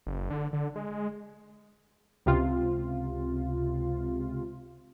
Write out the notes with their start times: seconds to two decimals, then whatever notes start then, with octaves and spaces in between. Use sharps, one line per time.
0.07 F#1
0.30 D3
0.53 D3
0.76 G#3
2.26 C#2 C3 F4